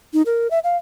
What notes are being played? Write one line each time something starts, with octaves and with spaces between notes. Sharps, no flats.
D#4
A#4
E5
F5